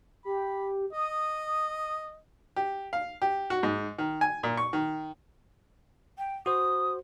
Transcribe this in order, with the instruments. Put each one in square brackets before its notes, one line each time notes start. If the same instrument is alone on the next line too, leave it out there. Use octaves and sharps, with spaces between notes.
[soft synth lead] G4 [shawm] B5
[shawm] D#5 [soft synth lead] D#6
[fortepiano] G4
F5
G4
F#4
G#2
D#3
G#5
A#2
C#6
D#3
[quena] G5
[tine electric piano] F#4 C5 [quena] D#6